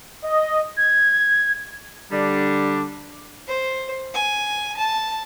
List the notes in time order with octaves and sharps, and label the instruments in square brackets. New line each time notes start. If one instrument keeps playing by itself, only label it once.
[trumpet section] D#5
[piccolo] G#6
[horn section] D3 G3 D4
[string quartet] C5
G#5
A5